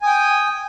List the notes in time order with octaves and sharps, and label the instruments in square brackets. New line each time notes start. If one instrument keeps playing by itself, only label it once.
[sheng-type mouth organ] G#5
D#6
G5